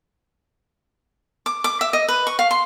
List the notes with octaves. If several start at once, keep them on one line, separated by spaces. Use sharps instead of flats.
D6
D6
E5
D#5
B4
C#6
F5
C6